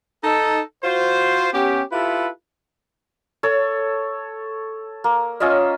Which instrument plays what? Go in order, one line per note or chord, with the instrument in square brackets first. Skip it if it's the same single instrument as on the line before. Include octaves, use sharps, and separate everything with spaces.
[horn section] D#4 A4
F4 F#4 C5
B3 C#4 G4
E4 F4 G4 A4 B4
[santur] A4 C#5
A#3
C#4 F4 D#5 E5